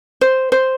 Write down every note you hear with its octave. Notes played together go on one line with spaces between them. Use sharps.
C5
C5